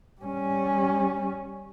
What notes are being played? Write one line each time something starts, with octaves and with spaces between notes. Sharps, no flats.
G3 C#4